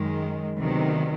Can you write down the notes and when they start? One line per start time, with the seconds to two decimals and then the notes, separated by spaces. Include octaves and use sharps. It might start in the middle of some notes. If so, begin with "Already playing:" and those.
Already playing: F#2 D#3 G#3
0.59 D2 C3 D#3 F#3 B3